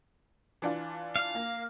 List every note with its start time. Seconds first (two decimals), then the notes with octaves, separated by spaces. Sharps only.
0.62 E3 D4 F4
1.16 F5
1.35 A#3